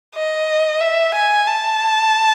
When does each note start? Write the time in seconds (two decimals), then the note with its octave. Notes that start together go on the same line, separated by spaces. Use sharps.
0.15 D#5
0.80 E5
1.14 G#5
1.47 A5